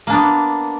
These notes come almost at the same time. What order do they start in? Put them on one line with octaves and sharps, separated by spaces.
A#3 D4 B3